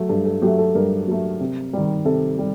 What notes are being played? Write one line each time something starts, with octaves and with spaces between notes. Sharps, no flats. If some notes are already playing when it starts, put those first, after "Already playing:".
Already playing: F#3 A3
G2 A4
A4
F#3 A3 G4
A4
G2 A#4
F#3 A3
C3
D#3 G3
C3 A4
G3